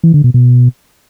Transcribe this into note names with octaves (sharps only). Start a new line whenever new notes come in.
E3
D3
B2
B2